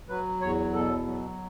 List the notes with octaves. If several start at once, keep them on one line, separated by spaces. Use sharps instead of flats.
F#3 B4
E2 C#5
B2 A4
F#3